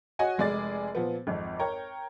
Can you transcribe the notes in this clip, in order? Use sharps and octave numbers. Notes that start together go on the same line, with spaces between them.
F#4 C#5 D#5 F#5 G#5
F1 G#3 G#4 D5 A6
A#2 F3 B3
G#1 F2
A#4 C#5 G5 A#5